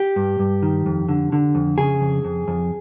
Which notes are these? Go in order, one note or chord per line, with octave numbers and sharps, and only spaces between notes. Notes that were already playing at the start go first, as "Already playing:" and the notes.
Already playing: G4
G2
G2
D#3
F2
D3
D3
F2
C#3 G#4
F2
F2
F2